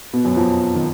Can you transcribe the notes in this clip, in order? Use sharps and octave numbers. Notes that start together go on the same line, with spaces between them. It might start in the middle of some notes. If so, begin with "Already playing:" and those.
B2 B3
F#2 F#3
F2 F3
D#3